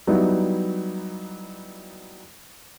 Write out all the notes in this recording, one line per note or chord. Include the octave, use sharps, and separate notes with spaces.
F#3 G3 B3 D#4 E4